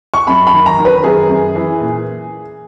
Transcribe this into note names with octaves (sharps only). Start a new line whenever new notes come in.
C#6
F#2 B5
B5
D#3
A#5
D#3
B4
F#2 G#4
F#2
E3
A#2